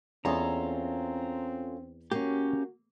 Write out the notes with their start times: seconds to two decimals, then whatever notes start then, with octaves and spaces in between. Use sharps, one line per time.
0.25 E2 C4 C#4 F4 A4 D#5 A#5
2.12 A#3 C#4 F#4 G4